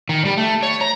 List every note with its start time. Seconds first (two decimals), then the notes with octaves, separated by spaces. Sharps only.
0.09 D#3
0.25 G3
0.38 A3
0.63 C#5
0.81 A#5